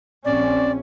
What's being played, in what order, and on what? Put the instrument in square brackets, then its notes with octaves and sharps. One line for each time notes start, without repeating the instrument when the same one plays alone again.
[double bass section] A#1 C#4 [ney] C4 [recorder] D5